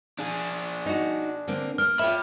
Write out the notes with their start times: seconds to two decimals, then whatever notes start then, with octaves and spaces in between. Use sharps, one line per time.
0.19 D4 G#4
0.86 D#4 F#4
1.48 D3 A#3 C4
1.78 A#3 F6
1.99 F4 C#5 E5 G5 B5